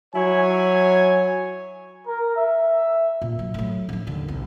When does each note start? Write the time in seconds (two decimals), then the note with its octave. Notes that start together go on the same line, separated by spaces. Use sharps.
0.15 F#3 E4 C#5 G#5
2.07 A#4
2.36 E5
3.22 A#2
3.39 F#3
3.54 A2 F#3
3.89 F3 D4
4.07 D#2 D3
4.28 B1